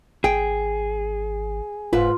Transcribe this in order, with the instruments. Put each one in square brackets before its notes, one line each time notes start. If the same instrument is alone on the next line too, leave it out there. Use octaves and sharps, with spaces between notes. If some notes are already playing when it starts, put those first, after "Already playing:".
[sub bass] G#1 [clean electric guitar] G#4 [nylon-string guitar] G5
[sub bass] F1 [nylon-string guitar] G#2 B4 [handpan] F4